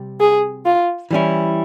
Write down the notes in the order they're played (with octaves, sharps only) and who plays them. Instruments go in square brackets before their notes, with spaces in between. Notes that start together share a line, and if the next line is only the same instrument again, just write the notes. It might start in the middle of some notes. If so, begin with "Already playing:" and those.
Already playing: [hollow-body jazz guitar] C3 G3 C4
[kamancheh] G#4
F4
[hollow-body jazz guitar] E3 G3 C#4 E4